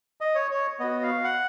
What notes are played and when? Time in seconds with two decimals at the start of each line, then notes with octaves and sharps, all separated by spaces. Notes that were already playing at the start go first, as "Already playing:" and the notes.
0.21 D#5
0.35 C#5
0.51 C#5
0.80 B3 F#4 D#5
1.03 F5
1.24 F#5